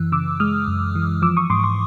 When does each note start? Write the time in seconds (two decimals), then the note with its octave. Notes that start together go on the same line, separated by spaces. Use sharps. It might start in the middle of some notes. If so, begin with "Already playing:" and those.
Already playing: F#2 E3 E6 F#6
0.12 C#3 D6 E6
0.40 G#3 D#6 F6
0.67 F#2
0.95 E3
1.22 F3 D6 E6
1.37 C#6 D#6
1.50 G#2 C6 D6
1.63 C6 D6